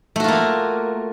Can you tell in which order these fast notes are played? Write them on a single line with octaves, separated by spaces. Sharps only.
A3 F#4 F4 A#3